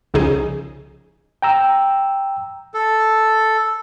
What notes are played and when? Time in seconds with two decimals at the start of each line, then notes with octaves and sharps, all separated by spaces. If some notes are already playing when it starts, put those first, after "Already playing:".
0.14 C2 C#3 F3 D#4 G#4
1.42 G5 A#5 E6
2.74 A4